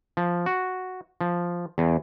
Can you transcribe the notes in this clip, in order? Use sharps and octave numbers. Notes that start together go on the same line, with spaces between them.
F3
F#4
F3
E2